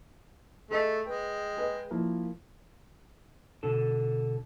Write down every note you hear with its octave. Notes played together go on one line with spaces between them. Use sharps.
A3 G#4 A4 D#5
G#3 B4 G5
G#4 B4 D#5
F3 A#3 E4
B2 D3 A4